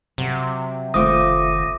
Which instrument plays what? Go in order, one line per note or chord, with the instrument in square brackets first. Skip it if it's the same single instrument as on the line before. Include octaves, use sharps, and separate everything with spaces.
[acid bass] C3 [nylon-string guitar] F#3
[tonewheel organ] F#1 D#3 [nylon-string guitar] A3 F4 C5 [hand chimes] D6 D#6